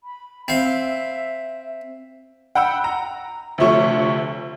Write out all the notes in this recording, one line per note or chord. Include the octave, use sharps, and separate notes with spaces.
B5
C4 E5 F5
F#5 G5 B5 E6
A#5
D2 C3 F3 A3 C#5 C#6